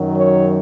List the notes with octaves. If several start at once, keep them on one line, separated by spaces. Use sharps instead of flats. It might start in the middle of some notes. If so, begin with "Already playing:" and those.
Already playing: F#2 D#3 F#3
C#5